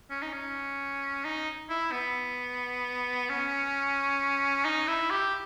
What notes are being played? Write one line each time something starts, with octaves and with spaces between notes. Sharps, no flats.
C#4
D#4
C#4
D#4
E4
B3
C#4
D#4
E4
G4